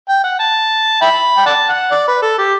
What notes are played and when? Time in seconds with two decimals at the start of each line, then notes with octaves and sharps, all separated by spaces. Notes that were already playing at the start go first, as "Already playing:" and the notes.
0.09 G5
0.24 F#5
0.40 A5
1.01 E5 G5 B5
1.37 G5
1.46 D5 F#5 A5
1.69 F#5
1.91 D5
2.08 B4
2.22 A4
2.38 G4